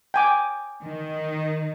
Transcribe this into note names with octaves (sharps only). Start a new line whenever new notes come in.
G5 G#5 D6
D#3